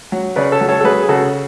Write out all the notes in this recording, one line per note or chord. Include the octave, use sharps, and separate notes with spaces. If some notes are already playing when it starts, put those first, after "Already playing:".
F#3
C#3 B4 D5
A4 C#5
F#3
A4 C#5
A4
F#3 G#4 B4
G#4
C#3 F#4 A4